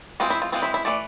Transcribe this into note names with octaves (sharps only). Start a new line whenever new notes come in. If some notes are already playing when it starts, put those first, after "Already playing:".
E3 G#3 C4 F4
E4
F4
E3 G#3 C4 F4
E4
E4
E3 A3 D5